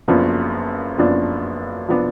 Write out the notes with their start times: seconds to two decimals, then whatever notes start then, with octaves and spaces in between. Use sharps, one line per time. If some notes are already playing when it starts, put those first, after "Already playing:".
0.08 F#1 F#2 F3 B3 D4
0.98 F#1 F#2 F3 B3 D4
1.88 F3 B3 D4